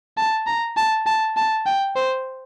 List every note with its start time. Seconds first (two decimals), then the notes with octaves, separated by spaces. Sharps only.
0.17 A5
0.47 A#5
0.77 A5
1.06 A5
1.37 A5
1.66 G5
1.96 C5